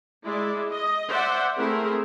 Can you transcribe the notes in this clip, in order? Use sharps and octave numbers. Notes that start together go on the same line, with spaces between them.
G#3 E4 D5
D#5
C5 D5 E5 F#5
A3 C4 E4 G#4 A#4